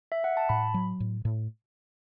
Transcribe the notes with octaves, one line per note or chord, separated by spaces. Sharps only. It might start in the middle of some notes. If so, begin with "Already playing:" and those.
E5
F#5
A5
A2 B5
F#3
A2
A2